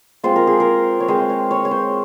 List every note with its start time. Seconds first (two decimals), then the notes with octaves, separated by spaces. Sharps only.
0.23 G#3 C4 F4 C5
0.36 A#4
0.47 G#4
0.60 A#4
1.00 C#5
1.08 G#3 C4 F4 C5
1.30 C#5
1.51 C#5
1.65 C#5
1.71 C5